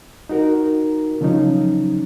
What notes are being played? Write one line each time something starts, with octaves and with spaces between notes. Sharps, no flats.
D#4 F#4 A#4
C#3 F3 F#3 C#4 D#4